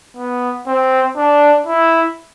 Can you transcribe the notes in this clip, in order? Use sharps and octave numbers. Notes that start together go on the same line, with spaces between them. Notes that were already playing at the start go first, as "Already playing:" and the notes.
B3
C4
D4
E4